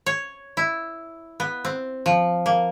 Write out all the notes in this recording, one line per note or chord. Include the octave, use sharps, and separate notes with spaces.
C#5
E4
B3
C4
F3
A#3